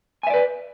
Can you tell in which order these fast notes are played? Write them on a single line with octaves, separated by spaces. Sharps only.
G#5 E5 D5 B4